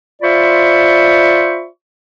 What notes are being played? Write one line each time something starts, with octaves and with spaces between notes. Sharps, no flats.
F4 C5 D5 E5 B5 C#6